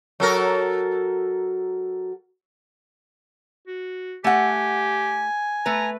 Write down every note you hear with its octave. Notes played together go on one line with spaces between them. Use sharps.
F#3 A4 A#4
F#4
A3 G4 F#5 G#5
A3 B4 A#5